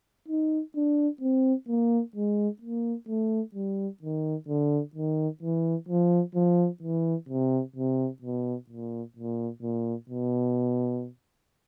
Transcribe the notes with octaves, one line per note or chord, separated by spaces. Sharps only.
D#4
D4
C4
A#3
G#3
A#3
A3
G3
D#3
D3
D#3
E3
F3
F3
E3
C3
C3
B2
A#2
A#2
A#2
B2